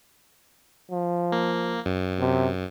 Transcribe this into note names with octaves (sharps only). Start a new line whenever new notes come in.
F3
A#3
F#2
C3